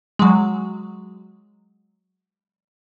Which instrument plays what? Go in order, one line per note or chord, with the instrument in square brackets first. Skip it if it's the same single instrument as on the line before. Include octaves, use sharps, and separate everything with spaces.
[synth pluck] F#3 G#3